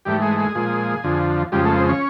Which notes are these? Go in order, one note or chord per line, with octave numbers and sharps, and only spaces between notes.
G#2 E3 G3 A3 G4
G#3 G#4
G#3 G#4
A#2 F3 G#3
F2 D3 F3
F2 C#3 F3 G3 G#3 G4
A3 A4
C4 C5
C#4 C#5